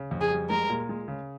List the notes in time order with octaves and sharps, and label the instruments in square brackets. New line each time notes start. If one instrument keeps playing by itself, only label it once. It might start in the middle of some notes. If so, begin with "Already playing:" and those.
Already playing: [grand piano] C#3
F2
[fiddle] G#4
[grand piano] G3
[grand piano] G#3 [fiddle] A#4
[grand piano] A#2
G#3
C#3